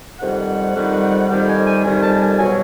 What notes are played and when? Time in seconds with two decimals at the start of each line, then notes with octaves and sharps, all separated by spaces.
0.20 F2 C3 D#3 G3 F#5
0.75 F2 C3 D#3 G3
1.29 F2 C3 D#3 G3
1.48 G#5
1.66 G#5
1.83 F2 C3 D#3 G3 G#5
2.02 A5
2.12 A5
2.20 G#5
2.38 B2 F#3 G#5